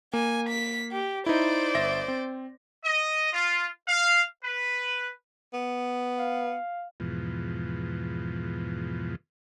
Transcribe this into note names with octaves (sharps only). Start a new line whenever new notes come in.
A#3 G#5
B6
G4
D#4 E4 C5 D5
G1 E5 A#6
C4
D#5
F4
F5
B4
B3
F5
E2 G#2 B2 F3